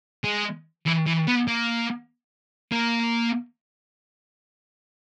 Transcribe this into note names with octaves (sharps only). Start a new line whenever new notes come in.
G#3
E3
E3
B3
A#3
A#3